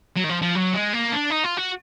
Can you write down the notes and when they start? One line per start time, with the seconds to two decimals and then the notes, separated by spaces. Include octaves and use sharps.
0.17 F#3
0.24 D#3
0.30 F3
0.42 F3
0.55 F#3
0.73 G#3
0.93 A#3
1.13 D4
1.31 D#4
1.44 F4
1.58 F#4